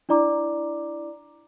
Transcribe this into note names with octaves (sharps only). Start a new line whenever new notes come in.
D4 E4 D5 A#5 D6